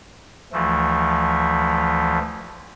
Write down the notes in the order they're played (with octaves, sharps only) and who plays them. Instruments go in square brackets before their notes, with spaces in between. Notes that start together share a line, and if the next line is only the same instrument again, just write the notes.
[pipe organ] D2 E3 F3 A3